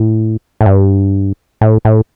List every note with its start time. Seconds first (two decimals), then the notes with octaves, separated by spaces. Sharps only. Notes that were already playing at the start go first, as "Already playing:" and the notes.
Already playing: A2
0.61 A2
0.66 G2
1.61 A2
1.85 A2